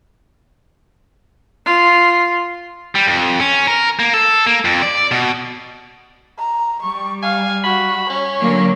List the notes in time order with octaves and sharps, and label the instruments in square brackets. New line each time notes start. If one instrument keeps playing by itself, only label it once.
[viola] F4
[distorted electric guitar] G3
F2
C#4
A#4
A#3
A4
A#3
F2
D5
B2
[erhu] A#5
[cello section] G3 [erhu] C#6
[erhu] F5 [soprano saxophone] G#5
[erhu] F#4 [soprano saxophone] B5
[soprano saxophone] C#4 [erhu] C#5
[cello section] D3 F#3 A#3